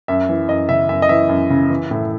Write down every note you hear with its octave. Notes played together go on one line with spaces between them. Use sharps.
F#2 E5
E3
F#2 D#5
C#3 E5
F#2 E5
D#5
E3 E5
F#2
C#3
E3
A2